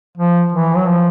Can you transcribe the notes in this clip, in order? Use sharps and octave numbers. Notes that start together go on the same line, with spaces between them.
F3
E3
F#3
F3